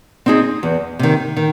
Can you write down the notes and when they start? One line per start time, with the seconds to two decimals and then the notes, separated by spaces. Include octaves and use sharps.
0.26 C4 D#4 G#4
0.63 E2
0.99 C3 D#3
1.37 D#3